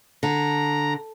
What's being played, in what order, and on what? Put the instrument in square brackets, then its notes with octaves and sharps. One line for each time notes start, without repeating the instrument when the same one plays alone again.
[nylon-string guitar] D3 [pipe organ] A#5